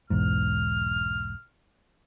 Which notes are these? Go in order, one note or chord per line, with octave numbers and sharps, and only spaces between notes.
B1 E2 G#2 F6